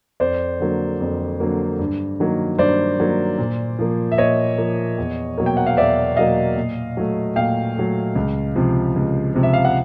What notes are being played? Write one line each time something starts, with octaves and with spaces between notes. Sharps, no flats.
F2 C5 D5
D3 F#3 A#3
F2
D3 F#3 A#3
G2
D#3 F#3 A#3
G2 C5 D5
D#3 F#3 A#3
A#2
F3 A#3
E5
A#2 C#5 D#5
F3 A#3
E2
B2 F#3 A#3
G5
F#5
F5
E2 D5 E5
B2 F#3 A#3 D#5 F5
A#2
F#3 A3
A#2 F5 G5
F#3 A3
C#2
C3 F3
C#2
C3 F3
E5
F5
F#5